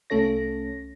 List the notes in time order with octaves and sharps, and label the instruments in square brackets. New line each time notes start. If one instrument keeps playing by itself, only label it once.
[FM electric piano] C2 A3 C#4 A4 C#5 A#6